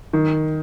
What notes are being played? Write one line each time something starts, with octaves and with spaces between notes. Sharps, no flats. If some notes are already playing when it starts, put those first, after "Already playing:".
D#3